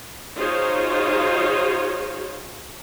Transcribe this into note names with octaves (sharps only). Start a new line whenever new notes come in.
D#4 F4 F#4 G#4 C5 C#5